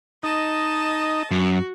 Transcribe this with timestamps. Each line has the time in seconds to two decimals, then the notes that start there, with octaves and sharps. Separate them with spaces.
0.23 D#4 D#5 A5
1.31 F#2 F#4